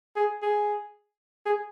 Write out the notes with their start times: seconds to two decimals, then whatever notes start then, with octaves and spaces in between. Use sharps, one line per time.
0.16 G#4
0.42 G#4
1.46 G#4